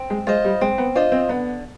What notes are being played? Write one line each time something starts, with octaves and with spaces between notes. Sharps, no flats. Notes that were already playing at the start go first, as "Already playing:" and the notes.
Already playing: C4
G#3
G#3 F4 C5 D#5
G3
G#3 C4
B3
D4 F4 C5 D#5
C4
D3 B3